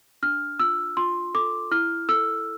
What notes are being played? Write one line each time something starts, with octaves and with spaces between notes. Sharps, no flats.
D4 F6
F4 E6
F4 C6
A4 D6
E4 F6
A4 E6